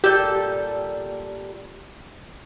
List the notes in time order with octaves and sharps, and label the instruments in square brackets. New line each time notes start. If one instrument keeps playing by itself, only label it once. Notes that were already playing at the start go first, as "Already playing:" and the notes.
[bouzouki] A#2 G3 A4 [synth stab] G4 [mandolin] E6 G6